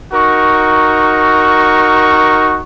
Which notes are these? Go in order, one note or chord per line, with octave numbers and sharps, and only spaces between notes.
D#4 F#4 A#4 C#6